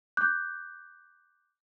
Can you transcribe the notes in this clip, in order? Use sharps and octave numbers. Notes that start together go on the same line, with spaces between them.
D6 F#6 G6